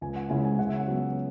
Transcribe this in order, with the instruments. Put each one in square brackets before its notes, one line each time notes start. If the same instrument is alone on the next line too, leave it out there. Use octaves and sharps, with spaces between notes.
[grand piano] C#2 G#5
F#5
C#3 G#3 C#4 E4 G#5
G#5
C#3 F#5
E5
F#5
F#3 B3